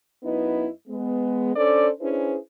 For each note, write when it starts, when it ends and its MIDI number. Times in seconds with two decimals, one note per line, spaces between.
0.23 0.68 42
0.23 0.68 59
0.23 0.68 63
0.23 0.68 64
0.23 0.68 71
0.23 0.68 75
0.88 1.55 56
0.88 1.55 59
1.55 1.88 61
1.55 1.88 62
1.55 1.88 69
1.55 1.88 72
1.55 1.88 74
1.99 2.36 61
1.99 2.36 62
1.99 2.36 64
1.99 2.36 68
1.99 2.36 71
1.99 2.36 72